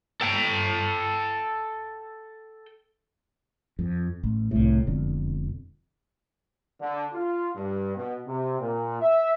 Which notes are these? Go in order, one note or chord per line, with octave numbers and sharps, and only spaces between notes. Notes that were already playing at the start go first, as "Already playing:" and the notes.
A4 G5
F2
A1
C2 A2
E1 F2 D3
D3
F4
G2
B2
C3
A#2
E5